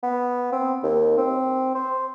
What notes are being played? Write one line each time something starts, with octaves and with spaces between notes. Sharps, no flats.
B3
C4
D#2
C4
C5